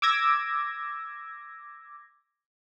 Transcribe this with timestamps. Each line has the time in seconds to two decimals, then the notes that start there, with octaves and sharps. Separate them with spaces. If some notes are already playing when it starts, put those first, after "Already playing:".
0.02 D6 E6 G#6 A#6